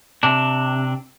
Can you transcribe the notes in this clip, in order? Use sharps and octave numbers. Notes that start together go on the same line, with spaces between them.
C3 D4